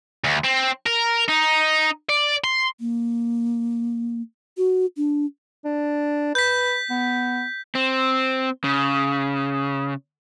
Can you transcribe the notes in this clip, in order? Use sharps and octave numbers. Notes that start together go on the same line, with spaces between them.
D2
C4
A#4
D#4
D5
C6
A#3
F#4
D4
D4
B4 G6 B6
B3
C4
C#3